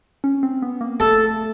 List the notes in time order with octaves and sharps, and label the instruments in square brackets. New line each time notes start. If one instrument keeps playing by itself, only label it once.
[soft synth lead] C#4
C4
B3
A#3
[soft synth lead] A3 [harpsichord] A4